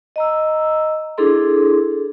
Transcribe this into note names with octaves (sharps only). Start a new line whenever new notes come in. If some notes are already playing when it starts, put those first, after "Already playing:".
D#5 A#5 E6
D4 E4 G#4 A4 C6